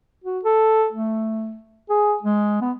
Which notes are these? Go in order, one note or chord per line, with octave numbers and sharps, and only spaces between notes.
F#4
A4
A3
G#4
G#3
B3